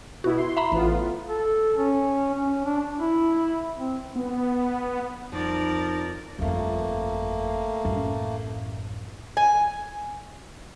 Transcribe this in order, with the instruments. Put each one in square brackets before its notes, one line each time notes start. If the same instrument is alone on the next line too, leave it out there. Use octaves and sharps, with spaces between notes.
[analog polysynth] B2 B3 E4 [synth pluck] F#4
[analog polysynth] C6
[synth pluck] E5 A#5 B5
[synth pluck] A1 [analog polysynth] A2 B3 F4
[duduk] A4
C#4
C#4
D4
E4
C4
[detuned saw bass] B3
[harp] F2 [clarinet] F3 [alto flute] D#4 [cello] A#4 D5
[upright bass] G1 F2 [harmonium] A3 A#3
[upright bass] A1 F#2
[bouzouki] G#5